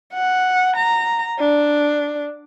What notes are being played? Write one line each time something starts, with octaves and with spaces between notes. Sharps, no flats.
F#5
A#5
D4